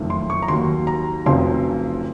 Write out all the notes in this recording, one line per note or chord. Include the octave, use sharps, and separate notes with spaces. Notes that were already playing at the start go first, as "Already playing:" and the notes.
Already playing: F#1 F2 D#3 A3
C6
C#6
A#5
D#2 D#3 F#3 A#3 C6
A#5
F1 F2 C#3 F#3 C4 C6